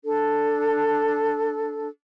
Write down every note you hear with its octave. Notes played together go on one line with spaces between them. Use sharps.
D4 A4